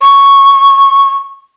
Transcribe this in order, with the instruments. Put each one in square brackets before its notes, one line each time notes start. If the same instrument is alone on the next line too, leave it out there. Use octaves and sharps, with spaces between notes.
[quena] C#6